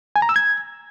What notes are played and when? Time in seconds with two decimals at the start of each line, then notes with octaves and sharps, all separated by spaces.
0.16 G#5
0.22 A#5
0.29 E6
0.36 G#6